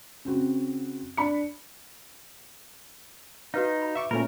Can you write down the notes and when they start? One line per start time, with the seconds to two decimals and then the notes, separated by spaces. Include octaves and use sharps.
0.25 C#3 C4 F#4
1.17 D4 B5 C#7
3.54 D#4 F#4 B4 F5
3.82 B5
3.95 E5 C#6 D6
4.11 A#2 A3 C#4 A#4 B5